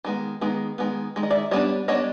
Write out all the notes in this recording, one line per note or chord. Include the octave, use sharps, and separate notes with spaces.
D#3 G#3 B3
D#3 G#3 B3
D#3 G#3 B3
D#3 G#3
D#5
D5 E5
G3 B3 D4 C#5 D#5
G3 B3 D4 C#5 D#5